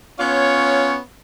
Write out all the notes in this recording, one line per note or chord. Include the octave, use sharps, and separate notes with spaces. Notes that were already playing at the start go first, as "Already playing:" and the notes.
B3 C#4 F4 C#5